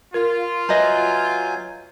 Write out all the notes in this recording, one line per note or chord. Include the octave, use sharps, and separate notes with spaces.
F4 A#4
F#3 B4 D#5 E5 G#5 A#5 G6